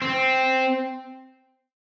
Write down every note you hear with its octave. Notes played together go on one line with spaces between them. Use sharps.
C4